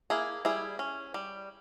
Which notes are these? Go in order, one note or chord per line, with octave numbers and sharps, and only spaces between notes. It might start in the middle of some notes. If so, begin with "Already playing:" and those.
A#3 E4 G#4
G3 E4 G#4
C#4
G3